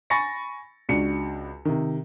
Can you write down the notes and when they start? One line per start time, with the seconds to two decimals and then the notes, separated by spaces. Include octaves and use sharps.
0.10 G#5 B5 C#6 A6 A#6 C#7
0.89 C#2 D4 F#4 C#7
1.65 C3 D#3